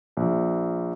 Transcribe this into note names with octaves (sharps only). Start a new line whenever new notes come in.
A#1